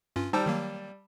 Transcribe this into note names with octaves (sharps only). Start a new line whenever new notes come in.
G2 C#4 F4
G3 D#4 C5 G5 A5 E6
D#3 F#3 A#3